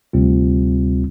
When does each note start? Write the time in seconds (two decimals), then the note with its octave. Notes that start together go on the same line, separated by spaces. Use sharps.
0.13 D2 C3 G3 C4 F4